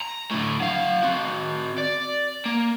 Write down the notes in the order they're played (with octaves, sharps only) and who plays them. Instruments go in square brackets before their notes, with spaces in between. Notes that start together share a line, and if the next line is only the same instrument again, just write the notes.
[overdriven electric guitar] A#5
A2 D3
F#3 F5
C4 F#4
D5
A#3